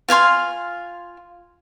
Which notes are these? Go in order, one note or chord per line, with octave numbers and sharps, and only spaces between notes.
F4 F5 G#5 C6